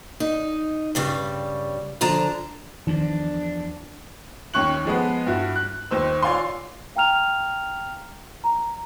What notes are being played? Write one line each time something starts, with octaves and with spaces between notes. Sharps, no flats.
D#4
G2 C#3 G3
D3 F3 A5 A#5
E2 D#3 F3 D4
D#2 C#4 C#6 F#6 F#7
F3 G#3 B3
G2 E4 F#4
F#6
D#2 C5 E6
F4 C#5 D5 F5 G#5 C6
F5 G5 A#5 F6 F7
A#5